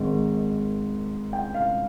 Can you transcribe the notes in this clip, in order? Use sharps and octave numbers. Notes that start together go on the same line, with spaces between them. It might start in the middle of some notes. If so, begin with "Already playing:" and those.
Already playing: G#1 G#2 D#3
G5
F5